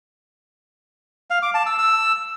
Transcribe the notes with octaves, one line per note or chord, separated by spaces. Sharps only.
F5
D6
A5
E6
E6